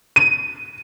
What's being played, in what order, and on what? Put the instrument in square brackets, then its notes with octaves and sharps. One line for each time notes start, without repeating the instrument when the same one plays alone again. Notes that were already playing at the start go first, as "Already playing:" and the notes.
[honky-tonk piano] D#7